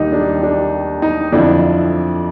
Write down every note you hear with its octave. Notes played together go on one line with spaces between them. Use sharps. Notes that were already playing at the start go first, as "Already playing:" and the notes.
Already playing: D#2 D#3 G3 D#4
D4
D4
D#4
F2 D3 F3 D4 E4